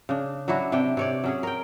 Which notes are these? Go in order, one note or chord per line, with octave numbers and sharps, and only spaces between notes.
C#3 D4
F#3 D4 E4 F#4
C3 D4 G4 G5
C3 C#5 D5
F#3 C#4 G#4
A#4 G5